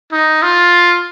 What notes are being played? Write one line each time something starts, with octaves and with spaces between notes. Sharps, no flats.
D#4
F4